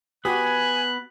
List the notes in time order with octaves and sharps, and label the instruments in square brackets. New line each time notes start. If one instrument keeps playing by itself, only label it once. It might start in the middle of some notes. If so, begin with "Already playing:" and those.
[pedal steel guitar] B3 B4 D#6 [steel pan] F#4 G4 [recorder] G#5 [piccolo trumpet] F#6